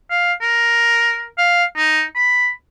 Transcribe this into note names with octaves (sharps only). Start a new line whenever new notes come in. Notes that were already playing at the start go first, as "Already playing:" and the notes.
F5
A#4
F5
D#4
B5